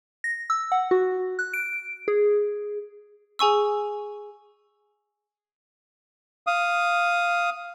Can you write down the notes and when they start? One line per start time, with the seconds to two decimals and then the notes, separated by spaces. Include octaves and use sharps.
0.24 A#6
0.50 E6
0.72 F#5
0.91 F#4
1.39 F#6
1.54 D7
2.08 G#4
3.39 G#4 G#5 C#6 E6
6.47 F5 D#6